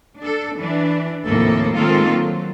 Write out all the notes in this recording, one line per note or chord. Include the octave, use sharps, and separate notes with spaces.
D4 A4
E3 D4
D#2 A2 C3 F3 A#3 A4
D#3 G#3 A#3 C4 F4 A4
F#3